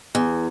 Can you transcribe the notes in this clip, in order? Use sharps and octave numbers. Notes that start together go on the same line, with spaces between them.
E2